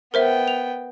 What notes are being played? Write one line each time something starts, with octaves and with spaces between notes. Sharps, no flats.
B3 A#4 C5 E5 G5
F7